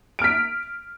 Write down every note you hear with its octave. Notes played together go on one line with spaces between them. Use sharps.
F6 B6 D7